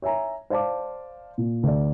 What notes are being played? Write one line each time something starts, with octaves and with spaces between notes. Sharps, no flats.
C#5 E5 G#5 A#5
C5 D5 F5 A5 D6
A#2
D2 D5